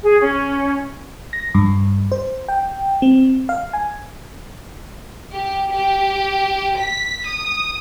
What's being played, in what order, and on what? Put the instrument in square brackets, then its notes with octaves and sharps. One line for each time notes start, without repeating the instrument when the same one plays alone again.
[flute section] G#4
C#4
[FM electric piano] A#6
G2
C5
G5
C4
F5
G#5
[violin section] G4
G4
B6
D#6